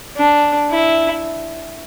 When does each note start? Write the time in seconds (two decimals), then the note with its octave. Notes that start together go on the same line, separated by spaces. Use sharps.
0.17 D4
0.71 E4